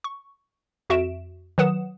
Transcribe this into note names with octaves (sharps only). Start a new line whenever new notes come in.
C#6
F2 F#4 E5 D7 E7
D#3 F#3 B4 F#5 D#6 E7